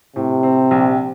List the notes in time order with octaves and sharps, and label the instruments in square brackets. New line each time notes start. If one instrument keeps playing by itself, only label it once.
[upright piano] A2 [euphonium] C3
[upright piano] C4
A#1